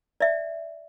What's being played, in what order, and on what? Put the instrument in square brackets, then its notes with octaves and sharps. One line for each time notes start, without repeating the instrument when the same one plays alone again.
[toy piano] D5 E5